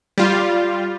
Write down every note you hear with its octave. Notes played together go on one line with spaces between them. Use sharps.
G3 F4